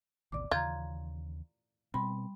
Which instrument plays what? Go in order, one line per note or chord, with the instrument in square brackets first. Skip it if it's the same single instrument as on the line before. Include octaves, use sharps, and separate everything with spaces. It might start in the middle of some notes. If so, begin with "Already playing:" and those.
[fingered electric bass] G#1 D2 B2 [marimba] D5 D6
[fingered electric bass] D#2 C#3 E3 [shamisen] F4 [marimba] A#5 G6 G#6
[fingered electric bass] B2 C4 [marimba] G3 B5 C6